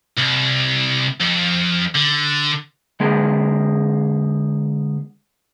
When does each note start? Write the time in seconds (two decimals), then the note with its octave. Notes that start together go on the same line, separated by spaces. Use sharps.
0.17 C2
1.20 F2
1.95 D3
3.00 D3 G#3 B3 G#4 A#4